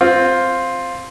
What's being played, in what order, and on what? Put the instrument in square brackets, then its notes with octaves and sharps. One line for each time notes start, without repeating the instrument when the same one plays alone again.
[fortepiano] C4 F4